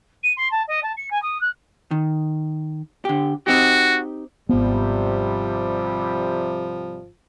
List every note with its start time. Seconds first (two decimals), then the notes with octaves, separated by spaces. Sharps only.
0.23 D#7
0.37 C6
0.51 A5
0.68 D#5
0.83 A5
0.97 C#7
1.10 G#5
1.22 D#6
1.41 F#6
1.91 D#3
3.05 D3 G4
3.47 C4 D#4 F#4 G4
4.49 G#1 C3 F3 G3 B3